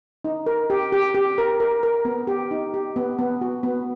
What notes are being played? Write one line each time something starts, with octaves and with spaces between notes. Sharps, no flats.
D#4
A#4
G4
G4
G4
A#4
A#4
A#4
B3
G4
D#4
G4
B3
B3
F#4
B3